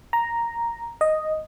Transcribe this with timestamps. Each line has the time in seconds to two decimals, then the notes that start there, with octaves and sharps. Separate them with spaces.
0.13 A#5
1.01 D#5